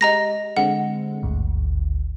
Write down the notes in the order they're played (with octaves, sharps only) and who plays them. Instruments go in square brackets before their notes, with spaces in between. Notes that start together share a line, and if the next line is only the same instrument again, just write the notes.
[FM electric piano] G#3 G4 [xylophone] D#5 A#5 A#6
[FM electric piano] D3 G#3 C4 [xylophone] F#5
[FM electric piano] G#1 D2 G2